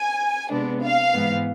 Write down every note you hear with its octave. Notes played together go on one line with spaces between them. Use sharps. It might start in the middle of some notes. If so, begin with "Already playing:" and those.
Already playing: G#5
C3 G#3 B3 D4
F5
G#2 E3 B3